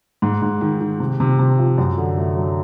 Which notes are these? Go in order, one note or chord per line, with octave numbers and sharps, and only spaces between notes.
G#2
G#2
D#3
D#3
C3
C3
C3
F3
F#2
D3
A3
F#3